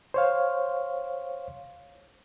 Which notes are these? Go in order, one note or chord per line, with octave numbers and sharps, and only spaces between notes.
C5 C#5 F5